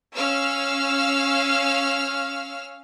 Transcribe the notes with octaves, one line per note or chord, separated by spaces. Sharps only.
C#4 F5 E6 F6